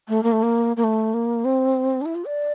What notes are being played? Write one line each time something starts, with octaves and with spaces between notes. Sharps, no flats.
A3
A#3
A3
A#3
A#3
A3
A#3
C4
D4
E4
F4
D5